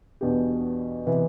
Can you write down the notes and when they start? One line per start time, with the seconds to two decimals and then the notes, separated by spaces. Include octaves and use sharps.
0.21 E2 B2 B3 D4 G4
1.07 C3 E3 B3